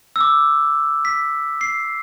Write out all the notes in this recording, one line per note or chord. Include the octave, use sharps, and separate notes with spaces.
E6
D6
B6
C7